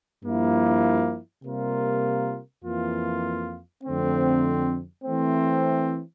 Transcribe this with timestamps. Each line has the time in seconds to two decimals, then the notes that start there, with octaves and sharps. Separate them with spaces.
0.23 G2 F3 A#3 E4
1.43 C3 G3 A#3 F4 A#4
2.64 F2 E3 A#3 F4
3.84 F2 D3 A3 C4
5.05 E3 A3 C4